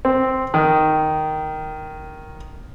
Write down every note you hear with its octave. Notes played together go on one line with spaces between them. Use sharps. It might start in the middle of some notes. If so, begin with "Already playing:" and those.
C4
D#3